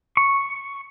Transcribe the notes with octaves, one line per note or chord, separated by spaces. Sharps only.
C#6